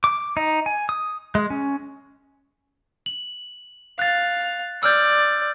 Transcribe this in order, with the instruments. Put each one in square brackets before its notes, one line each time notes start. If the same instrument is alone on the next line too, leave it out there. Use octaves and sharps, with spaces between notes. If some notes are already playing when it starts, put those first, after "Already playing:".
[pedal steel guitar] D6
D#4
G#5
D#6
G#3
C#4
[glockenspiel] F#7
[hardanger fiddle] F5 [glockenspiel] F#6 A6
[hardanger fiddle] D5 [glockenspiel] E6 F6 G6